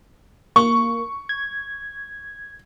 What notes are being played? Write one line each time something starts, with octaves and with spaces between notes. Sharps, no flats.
A#3 C#6
G#6